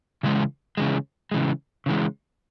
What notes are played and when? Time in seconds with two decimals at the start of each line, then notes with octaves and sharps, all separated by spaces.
0.23 C#3 E3 G#3
0.77 C#3 E3 G#3
1.31 C#3 E3 G#3
1.86 C#3 E3 G#3